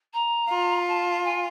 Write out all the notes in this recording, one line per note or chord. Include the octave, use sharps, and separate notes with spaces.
A#5
F4
A5
G#5